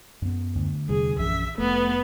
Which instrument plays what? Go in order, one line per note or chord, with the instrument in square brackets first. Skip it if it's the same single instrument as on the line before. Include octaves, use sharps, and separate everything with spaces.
[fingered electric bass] F#2 B3
[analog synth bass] D2
[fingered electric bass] E2 C3 G3 [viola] G#4
[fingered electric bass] A#1 E3 [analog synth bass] F#2 [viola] E5
[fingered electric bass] F1 [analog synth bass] A3 [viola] B3